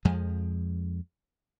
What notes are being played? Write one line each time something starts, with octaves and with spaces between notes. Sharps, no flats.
F2 F3 G#3